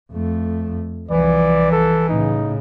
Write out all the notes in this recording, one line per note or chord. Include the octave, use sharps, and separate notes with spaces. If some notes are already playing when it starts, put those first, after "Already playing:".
F2 A3
C2 E3 F3 D5
A4
A2 C#3 D#4